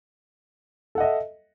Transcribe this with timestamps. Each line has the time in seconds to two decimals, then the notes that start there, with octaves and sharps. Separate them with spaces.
0.95 A4
0.98 F#5
1.00 D#5
1.03 E5